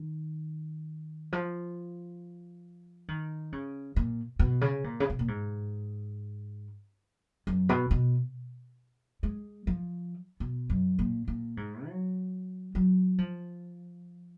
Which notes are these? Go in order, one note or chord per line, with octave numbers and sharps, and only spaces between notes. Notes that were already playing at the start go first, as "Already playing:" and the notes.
Already playing: D#3
F3
D#3
C#3
A#2
B2
C#3
A#2
C#3
B2
A#2
G#2
F#2
B2
B2
G#3
F3
B2
F#2
A#2
A#2
G#2
F#3
F#3
F3